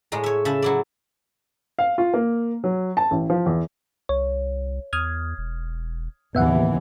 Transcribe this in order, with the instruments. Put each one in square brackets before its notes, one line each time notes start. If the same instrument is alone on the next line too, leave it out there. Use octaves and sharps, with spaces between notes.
[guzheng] A2 G#3 A#5
C#5 E5
C#3 E5 A5 B5
F#3 E4 D5
[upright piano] F5
F4
A#3
F#3
A5
A1
F3
E2
[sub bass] C2 [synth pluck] C#5
[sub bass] E2 [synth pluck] D#6 F6 G#6
[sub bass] E1
[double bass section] D#2 C#3 E3 [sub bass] A2 [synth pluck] B3 E5 F#5